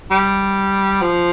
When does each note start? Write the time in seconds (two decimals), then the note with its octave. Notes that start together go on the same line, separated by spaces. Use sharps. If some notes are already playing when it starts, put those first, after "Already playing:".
0.11 G3
1.02 F3